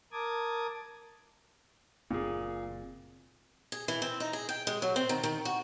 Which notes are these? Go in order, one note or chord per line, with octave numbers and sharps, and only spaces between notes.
A#4 A5 D6 D#6 G#6
F#1 A#2 A#3 C4 G#4
G#4
E3
C4
D#4
G#4
G5
G#3
F#3
C4
D#3
D#3
F#4